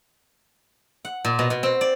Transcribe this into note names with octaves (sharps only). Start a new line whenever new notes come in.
F#5
A#2
B2
B2
C4
D5